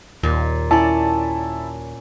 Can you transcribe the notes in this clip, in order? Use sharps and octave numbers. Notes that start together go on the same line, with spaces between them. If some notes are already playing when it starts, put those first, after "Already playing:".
D#2 A#2
C#4 E4 D5 A5